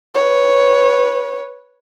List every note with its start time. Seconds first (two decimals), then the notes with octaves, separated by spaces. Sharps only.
0.15 B4 C#5